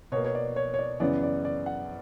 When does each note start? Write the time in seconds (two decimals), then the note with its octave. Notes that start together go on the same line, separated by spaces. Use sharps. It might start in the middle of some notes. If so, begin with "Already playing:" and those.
0.12 B2 C#5
0.17 A#3
0.25 C#5
0.35 D5
0.56 C#5
0.74 C#5
0.79 D5
1.00 F#2 C#3 E3 B3 D5
1.23 D5
1.45 D5
1.66 F#5